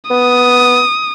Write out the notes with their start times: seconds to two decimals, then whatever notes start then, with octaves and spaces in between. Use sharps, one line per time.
0.10 B3 D#6